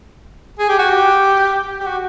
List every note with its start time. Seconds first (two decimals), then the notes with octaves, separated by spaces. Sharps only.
0.59 G#4
0.69 G4
0.79 F#4
0.89 G4
1.80 G4
1.86 F#4